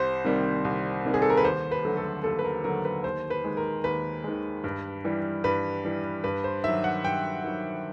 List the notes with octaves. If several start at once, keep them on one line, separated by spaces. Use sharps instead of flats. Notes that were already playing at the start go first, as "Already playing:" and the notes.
Already playing: C2 C5
C3 D#3 G3 A#3
C2
C3 D#3 G3 A#3
G#4
A4
A#4
B4
D#2 C5
B4
D3 F#3 A3
A4
D#2 A4
B4
A#4
D3 F#3 A3 A#4
B4
D#2 C5
B4
D#3 G#3
A#4
D#2 B4
D#3 G#3
G2
E3 G3
G2 B4
E3 G3
G2 B4
C5
D#3 F#3 E5
F#5
G2 G5
D#3 F#3